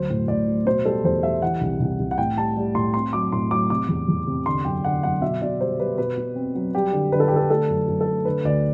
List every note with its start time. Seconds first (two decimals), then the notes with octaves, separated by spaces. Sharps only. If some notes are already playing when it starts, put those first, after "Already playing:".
Already playing: D2 F#3 C5
0.10 A2
0.28 A2 D5
0.48 F#3
0.66 B2 C5
0.85 G3 A4
1.04 E2 C5
1.23 G3 E5
1.42 E3 F#5
1.61 C2
1.80 C2
2.00 C2
2.11 F#5
2.18 A2 G5
2.38 G3 A5
2.57 G3
2.75 A2 C6
2.94 C4 C6
3.13 F#3 D6
3.32 A2 C6
3.51 F#3 D6
3.70 C3 D6
3.89 E2
4.08 E2
4.27 C3
4.46 D3 C6
4.65 F#2 G5
4.84 D3 F#5
5.03 F#2 F#5
5.22 B2 E5
5.42 B2 D5
5.61 G3 C5
5.79 G3 B4
5.98 B2 B4
6.18 B2
6.35 C4
6.55 F#3
6.74 G3 G4
6.93 D3
7.12 D3 B4
7.20 A4
7.28 D3 G4
7.36 A4
7.50 A3 A4
7.69 F#2
7.87 F#2
8.01 A4
8.08 A3
8.25 D3 B4
8.44 D2 D5